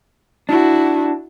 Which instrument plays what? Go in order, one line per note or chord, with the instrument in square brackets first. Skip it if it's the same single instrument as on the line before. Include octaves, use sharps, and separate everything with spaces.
[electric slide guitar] D4 [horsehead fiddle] E4 F#4